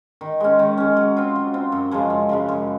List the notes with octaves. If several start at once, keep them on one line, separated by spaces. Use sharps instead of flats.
D#3
G#3 C#4
D#3
G#3 C#4
F#3
C4 F4
F#3
C4 F4
F#2
C#3 F3 G#3
F#2
C#3 F3 G#3
F#2